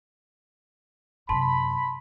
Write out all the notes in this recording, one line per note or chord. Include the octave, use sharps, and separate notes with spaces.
F#2 C3 A5 B5 C6